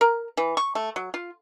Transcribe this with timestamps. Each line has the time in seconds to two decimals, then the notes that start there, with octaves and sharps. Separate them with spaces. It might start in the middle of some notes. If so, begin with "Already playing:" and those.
0.01 A#4
0.37 E3
0.57 C#6
0.75 A3
0.96 F#3
1.14 F4